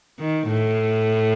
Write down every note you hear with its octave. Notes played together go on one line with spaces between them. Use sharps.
D#3
A2